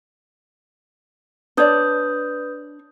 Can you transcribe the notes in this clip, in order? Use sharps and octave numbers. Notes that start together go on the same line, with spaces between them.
D4 B4 C#5 D5 D#6 G6